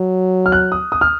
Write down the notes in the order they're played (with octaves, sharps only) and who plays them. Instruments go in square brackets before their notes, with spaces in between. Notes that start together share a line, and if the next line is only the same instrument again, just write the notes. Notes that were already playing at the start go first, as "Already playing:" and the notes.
Already playing: [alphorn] F#3
[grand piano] F6
F#6
D#6
D#6
F6